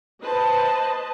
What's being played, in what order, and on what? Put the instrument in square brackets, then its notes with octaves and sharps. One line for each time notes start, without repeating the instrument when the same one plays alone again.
[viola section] B4 C5 D#5 A5